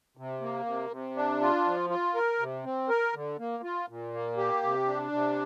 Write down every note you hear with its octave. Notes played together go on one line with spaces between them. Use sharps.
C3
A#3
C3
C3
D4
F4
F3
F4
A#4
C3
C4
A#4
D3
A#3
F4
A#2
A#3
G4
C3
D4
C3